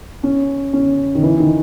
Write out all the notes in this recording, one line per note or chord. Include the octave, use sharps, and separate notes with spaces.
C#4
C#4
D#3
E3
D#3